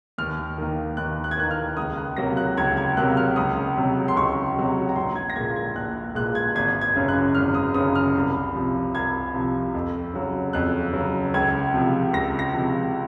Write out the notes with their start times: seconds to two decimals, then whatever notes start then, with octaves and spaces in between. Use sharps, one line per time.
0.18 D#2 F6
0.58 D#3 A#3
0.97 D#2 F#6
1.24 F#6
1.31 G#6
1.38 D#3 A#3 F#6
1.51 F6
1.77 C#2 D#6
1.97 F#6
2.17 C3 F#3 A#3 A#6
2.37 F#6
2.57 C#2 G#6
2.77 G#6
2.97 C3 F#3 A#3 F#6
3.17 F6
3.36 C#2 D#6
3.76 C3 F#3
4.08 C6
4.16 C#2 C#6
4.56 C3 F#3
4.89 A#5
4.96 A#1 C6
5.16 G#6
5.30 A#6
5.36 A#2 G#3 G#6
5.56 G#6
5.75 A#1 F#6
6.15 A#2 G#3 F#6
6.35 G#6
6.55 G#1 G#6
6.81 G#6
6.96 F#2 C#3
7.09 F#6
7.35 G#1 F6
7.55 D#6
7.74 F#2 C#3 D#6
7.95 F6
8.15 C2
8.55 C3 F3
8.95 C2 G#6
9.34 C3 F3
9.75 F2
10.14 C#3 F#3
10.53 F2 F#6
10.93 C#3 F#3
11.34 C#2 G#6
11.74 C3 F3
12.13 C#2 A#6
12.39 A#6
12.54 C3 F3